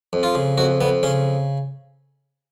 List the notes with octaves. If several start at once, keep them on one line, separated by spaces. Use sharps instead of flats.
F2
F4
C#3
F2 F#4
F2 B3
C#3 C#4